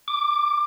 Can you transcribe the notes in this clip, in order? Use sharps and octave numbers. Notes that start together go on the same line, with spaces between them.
D6